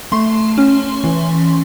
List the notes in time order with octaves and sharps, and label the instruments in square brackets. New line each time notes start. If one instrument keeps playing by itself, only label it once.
[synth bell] A3 C6
C#4
E3